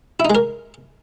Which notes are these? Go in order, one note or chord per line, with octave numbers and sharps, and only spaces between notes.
E4
D#4
G#3
A#4